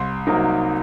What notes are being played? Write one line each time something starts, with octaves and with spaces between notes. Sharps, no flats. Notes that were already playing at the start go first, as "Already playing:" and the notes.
Already playing: C2 C6
C3 F#3 A#3 D#4